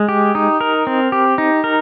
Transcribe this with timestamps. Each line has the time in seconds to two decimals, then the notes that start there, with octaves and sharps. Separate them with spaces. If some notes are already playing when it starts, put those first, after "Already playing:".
Already playing: G#3
0.09 G4
0.35 D#4
0.61 A#4
0.87 C4
1.12 G4
1.38 D#4
1.64 A#4